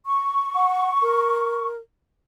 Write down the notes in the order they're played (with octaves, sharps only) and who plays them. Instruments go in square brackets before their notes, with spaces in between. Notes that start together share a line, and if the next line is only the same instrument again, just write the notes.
[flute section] C#6
[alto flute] F#5
A#4